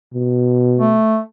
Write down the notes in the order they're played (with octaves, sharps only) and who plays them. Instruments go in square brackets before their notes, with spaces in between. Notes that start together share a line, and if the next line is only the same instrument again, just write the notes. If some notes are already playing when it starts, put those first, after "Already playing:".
[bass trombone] B2
[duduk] A3